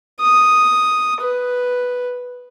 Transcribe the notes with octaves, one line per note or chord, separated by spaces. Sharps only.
D#6
B4